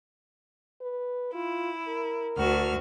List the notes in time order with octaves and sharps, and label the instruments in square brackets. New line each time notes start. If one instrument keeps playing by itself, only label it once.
[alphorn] B4
[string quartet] E4 [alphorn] F4
[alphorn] A#4
[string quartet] D2 F#4 F6